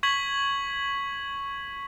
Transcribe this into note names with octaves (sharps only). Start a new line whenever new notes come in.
C#6 G#6 B6 F#7